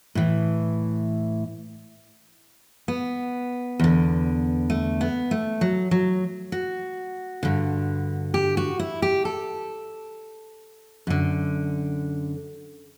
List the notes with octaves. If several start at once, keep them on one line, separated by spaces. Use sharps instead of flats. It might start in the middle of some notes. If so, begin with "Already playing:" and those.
A2 E3
B3
E2 D3
A3
B3
A3
F#3
F#3
F#4
G2 D3
G4
F#4
E4
G4
A4
F#2 D3